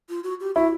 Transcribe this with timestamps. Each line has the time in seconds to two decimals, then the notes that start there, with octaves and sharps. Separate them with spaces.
0.09 F4
0.24 F#4
0.40 G4
0.55 E4 F#4